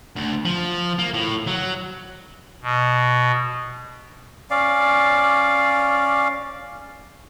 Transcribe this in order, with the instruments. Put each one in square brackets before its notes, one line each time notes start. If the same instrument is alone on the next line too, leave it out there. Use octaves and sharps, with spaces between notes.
[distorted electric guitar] D2
F3
A#3
A2
F#3
[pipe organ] B2
[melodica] C#4 D5 F5